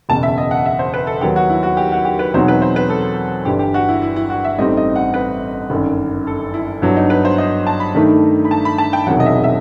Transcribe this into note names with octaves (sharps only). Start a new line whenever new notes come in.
F#1 E2 B2 A5
E5
D#5
F#5
E5
C5
B4
A4
D#2 D#3 F#3 B3 G4
F#4
E4
F#4
G4
F#4
G4
B4
E2 B2 F#3 C4 D#4 C5
B4
C5
B4
A4
G1 G2 E3 G4
G4
F#4
E4
E4
E4
F#4
E5
A1 A2 G3 C4 D#4 D#5
D#5
F#5
B4
G1 F#2 D#3
A4
E4
G2 F#3 B3 E4
D#4
B4
C5
D#5
A5
B5
G2 D#3 A3 D#4
B5
A5
B5
A5
G5
E1 E2 C3 D#3 F#3 F#5
D#5
E5
E5